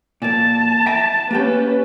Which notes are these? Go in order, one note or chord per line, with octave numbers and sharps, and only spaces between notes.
A#2 A#3 A5
E5 G5 A#5
A#3 C#4 G4 B4 G5